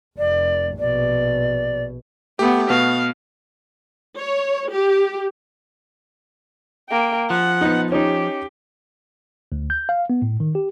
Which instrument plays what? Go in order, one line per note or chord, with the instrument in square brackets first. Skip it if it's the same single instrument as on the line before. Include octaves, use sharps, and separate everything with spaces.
[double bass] F1 [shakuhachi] D5
[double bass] A#1 B2 [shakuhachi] D5
[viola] A3 B3 [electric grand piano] G4
[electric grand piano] B2 B3 F#4 [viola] F5
[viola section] C#5
G4
[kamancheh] A#3 G5
[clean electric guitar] F3 [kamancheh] F#5
[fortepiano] B3 D#4
[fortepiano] C#4 D#4 [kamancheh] G4
[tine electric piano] D2
G6
F5
B3
A2
D#3
G4